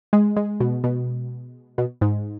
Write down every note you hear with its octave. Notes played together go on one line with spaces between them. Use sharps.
G#3
G#3
B2
B2
B2
G#2